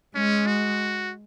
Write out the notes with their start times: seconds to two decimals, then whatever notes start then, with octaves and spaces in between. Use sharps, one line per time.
0.15 G#3 C#4
0.47 F#4